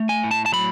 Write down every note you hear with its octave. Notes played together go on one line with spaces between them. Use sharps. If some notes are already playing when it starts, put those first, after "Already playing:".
Already playing: A3
G#5
A2
A5
A5
F#3 B5